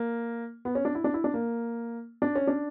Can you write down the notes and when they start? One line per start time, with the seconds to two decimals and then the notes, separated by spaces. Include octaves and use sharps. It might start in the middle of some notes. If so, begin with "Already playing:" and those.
Already playing: A#3
0.65 B3
0.75 C#4
0.85 D4
0.95 E4
1.04 D4
1.14 E4
1.24 D4
1.34 A#3
2.22 D4
2.35 C#4
2.47 D4